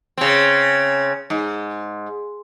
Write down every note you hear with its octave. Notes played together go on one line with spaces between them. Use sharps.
C#3 C4
G#2